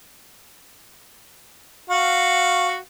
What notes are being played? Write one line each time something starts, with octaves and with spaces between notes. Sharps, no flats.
F#4 F5